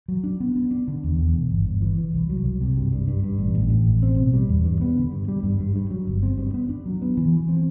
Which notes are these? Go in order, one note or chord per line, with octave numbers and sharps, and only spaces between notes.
F#3
D4
B3
B3
D4
D3
E2
E2
E1
G1
G1
E3
E3
C2
F#3
C2
C3
G2
G2
G2
G2
A1
A1
A2
A1
C4
B2
G3
E2
G2
B3
D3
G2
G3
G2
G2
G2
F#3
G1
C4
G2
B3
D4
F#3
B3
E3
E3
C4